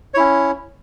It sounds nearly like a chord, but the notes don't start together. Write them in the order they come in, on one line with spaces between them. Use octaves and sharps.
C#5 E4 C#4